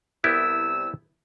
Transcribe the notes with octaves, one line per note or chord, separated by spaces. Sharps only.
C2 B3 E4 G4 E6